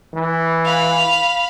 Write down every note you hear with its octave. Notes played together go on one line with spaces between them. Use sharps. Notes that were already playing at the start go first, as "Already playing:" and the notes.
E3
F5 B5